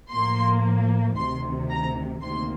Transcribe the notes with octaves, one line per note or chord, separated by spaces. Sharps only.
A2 F3 A#3 C6
D2 C3 D#3 C6
A#5
D2 C3 D#3 A#3 C6